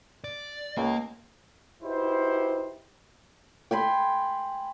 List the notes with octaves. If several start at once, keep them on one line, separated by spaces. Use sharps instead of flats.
D5
C#2 A#3
D#4 E4 F#4 G4 B4 C5
G5 G#5 B5 C6